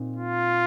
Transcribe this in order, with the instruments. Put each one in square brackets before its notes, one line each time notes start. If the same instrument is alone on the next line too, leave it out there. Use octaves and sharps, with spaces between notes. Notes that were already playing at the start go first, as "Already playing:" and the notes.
Already playing: [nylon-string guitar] A#2 C4 D#4
[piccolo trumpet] F4